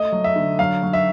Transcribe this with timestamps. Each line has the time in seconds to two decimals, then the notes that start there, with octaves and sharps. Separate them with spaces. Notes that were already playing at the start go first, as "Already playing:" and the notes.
Already playing: A3 D#5
0.12 F#3
0.24 E5
0.36 D3
0.59 F#3 F5
0.83 F#3
0.93 E5